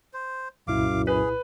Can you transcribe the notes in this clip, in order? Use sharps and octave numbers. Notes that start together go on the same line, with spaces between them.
C5
C2 F#2 A#2 E4 F5 D6
G#4 B4